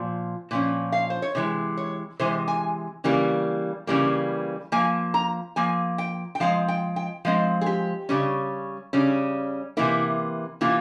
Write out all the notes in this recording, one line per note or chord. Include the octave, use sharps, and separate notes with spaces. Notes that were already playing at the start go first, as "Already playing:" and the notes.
Already playing: A#2 F3
A#2 F3 C#4
F5
C5
C#5
C3 E3 G#3
C#5
C3 E3 G#3 C5
G#5
C#3 E3 G3 A#3
C#3 E3 G3 A#3
F3 A#3 G#5
A#5
F3 A#3 G#5
G5
G5
F3 G#3 C4 F5
G5
G5
F3 G#3 C4 F5
G#4
G4
C#3 G3 C#4
C#3 G3 C#4
C3 E3 A#3 E4
C3 E3 A#3 F4